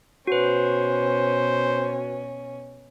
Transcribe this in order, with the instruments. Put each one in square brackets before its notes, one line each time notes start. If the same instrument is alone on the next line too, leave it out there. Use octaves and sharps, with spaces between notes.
[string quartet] B2 C#4 [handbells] F#4 B4 [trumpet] C5